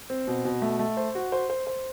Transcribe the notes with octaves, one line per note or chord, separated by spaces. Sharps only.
C4
B2
B2
A3
A3
C5
F#4
C5
C5
C5